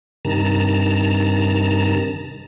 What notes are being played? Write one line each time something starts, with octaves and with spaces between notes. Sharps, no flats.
G2 C3 D#3 A5 A#5